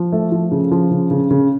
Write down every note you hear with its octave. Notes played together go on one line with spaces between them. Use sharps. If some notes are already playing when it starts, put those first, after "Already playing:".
Already playing: F3
A3
F3
C#3
F3
C#3
C#3
C#3